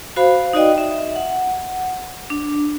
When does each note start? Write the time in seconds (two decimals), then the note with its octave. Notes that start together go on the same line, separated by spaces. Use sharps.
0.16 F#4 C5 F5 B5
0.53 D#4 F#4 D5 D#5 G5
0.78 E5
1.16 F#5
2.30 D4